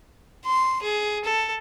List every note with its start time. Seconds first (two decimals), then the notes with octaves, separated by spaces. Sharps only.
0.46 C6
0.83 G#4
1.25 A4